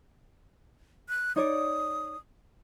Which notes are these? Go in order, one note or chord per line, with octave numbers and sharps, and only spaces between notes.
F#6
D#4 C#5 D5 D#6